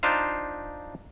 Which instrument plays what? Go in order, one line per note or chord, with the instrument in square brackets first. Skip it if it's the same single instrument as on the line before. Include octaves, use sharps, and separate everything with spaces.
[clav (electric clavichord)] D4 D#4 F4 C5 F5